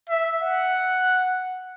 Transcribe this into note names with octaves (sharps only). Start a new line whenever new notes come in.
E5
F#5